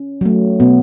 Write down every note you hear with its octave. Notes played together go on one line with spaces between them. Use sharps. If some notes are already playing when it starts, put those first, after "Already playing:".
Already playing: C#4
F#3 A3
B2 B3